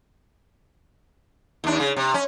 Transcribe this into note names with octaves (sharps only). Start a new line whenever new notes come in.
D#2 D4
C#3
C3
C#4